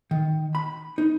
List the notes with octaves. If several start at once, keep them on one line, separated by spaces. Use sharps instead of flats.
D#3
B5
D#4